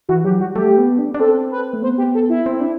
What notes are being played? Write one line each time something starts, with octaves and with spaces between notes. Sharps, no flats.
E3 F#4
F#3 G4
G3 F#4
A3 G4
B3
D4
D4
C4 A4
B4
A3
B3 C5
G4
A4
E4
C4
D4